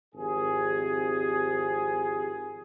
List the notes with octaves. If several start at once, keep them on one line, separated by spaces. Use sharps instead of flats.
G#1 F2 G4 G#4